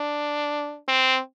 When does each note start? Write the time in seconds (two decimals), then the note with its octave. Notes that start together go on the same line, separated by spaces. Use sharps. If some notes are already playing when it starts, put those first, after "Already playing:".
Already playing: D4
0.88 C4